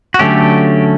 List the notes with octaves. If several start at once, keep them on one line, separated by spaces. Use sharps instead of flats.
F#4
D3 F#3 A3 C#4 G4